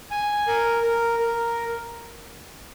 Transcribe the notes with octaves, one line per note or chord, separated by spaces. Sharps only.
G#5
A#4
A#4
A#4